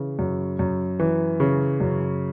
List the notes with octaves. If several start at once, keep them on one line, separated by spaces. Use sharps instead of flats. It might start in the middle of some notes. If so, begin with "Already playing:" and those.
Already playing: C#3 E3
F#2
F#2
E3
C#3
F#2